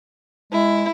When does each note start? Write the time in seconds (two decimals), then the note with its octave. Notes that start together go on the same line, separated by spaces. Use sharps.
0.53 G#3 E4